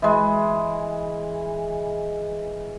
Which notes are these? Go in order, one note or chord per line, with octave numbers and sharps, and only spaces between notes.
E3 G#3